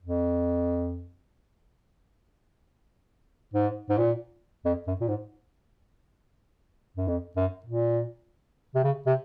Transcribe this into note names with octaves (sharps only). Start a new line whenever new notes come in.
F2
G#2
G#2
A#2
F2
F#2
A#2
G#2
F#2
F2
F#2
A#2
C3
C#3
C3